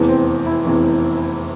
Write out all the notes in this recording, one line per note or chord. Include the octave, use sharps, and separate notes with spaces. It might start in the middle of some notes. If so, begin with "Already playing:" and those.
Already playing: F1 E2 E3
C4
E4
F1 E2 E3